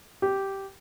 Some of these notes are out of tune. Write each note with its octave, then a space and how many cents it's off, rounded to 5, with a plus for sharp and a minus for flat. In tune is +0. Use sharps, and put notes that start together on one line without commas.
G4 -10